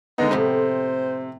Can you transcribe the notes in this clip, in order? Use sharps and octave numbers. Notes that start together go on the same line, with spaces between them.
D3 G#3 B3 D#4
F2 A2 C3 B3 C5